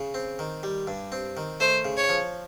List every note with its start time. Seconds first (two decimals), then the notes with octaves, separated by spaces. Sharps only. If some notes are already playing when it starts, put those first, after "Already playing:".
Already playing: C#3
0.14 C4
0.39 D#3
0.63 G3
0.87 G2
1.12 C4
1.37 D#3
1.60 A3 C5
1.85 C#3
1.97 C#5
2.09 F3